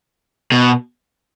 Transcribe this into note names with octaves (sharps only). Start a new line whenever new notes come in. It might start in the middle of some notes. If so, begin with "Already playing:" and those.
B2